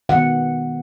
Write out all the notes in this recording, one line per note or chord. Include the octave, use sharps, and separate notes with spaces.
D#3 G#3 B3 F#5